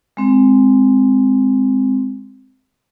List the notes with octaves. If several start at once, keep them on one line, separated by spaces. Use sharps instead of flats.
G#3 C4